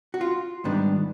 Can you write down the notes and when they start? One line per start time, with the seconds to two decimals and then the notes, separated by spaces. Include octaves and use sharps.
0.14 F#4
0.21 F4
0.64 G#2 D#3 G3 B3 D4